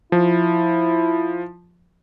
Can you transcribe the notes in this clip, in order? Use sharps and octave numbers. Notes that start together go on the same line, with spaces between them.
F3 E4